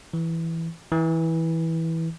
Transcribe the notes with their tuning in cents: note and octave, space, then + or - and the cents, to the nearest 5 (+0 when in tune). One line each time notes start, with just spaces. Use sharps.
E3 +0
E3 -15